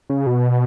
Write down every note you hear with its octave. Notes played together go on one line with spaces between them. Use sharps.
C#3
B2